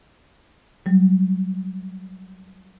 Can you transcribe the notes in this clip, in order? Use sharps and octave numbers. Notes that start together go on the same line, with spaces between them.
F#3 G3